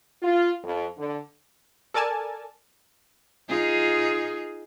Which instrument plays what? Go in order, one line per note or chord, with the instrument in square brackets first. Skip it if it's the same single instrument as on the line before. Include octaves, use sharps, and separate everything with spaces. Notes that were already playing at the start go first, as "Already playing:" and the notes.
[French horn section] F4
F2
D3
[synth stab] A4 A#4 D5 G#5 A5
[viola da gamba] D#4 F4 G#4